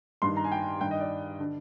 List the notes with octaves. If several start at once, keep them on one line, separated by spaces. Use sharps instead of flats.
G2 D#3 C6
A#5
G#5
G5
G2 D#3 G5
D#5
D5
D3